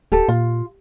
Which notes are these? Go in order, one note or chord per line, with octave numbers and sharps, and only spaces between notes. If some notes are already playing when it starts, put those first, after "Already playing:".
D1 G4 A4
A#2 F4